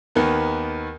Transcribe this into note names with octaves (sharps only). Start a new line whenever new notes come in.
D#2 D#3 B3